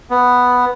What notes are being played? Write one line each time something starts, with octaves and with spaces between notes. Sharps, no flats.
B3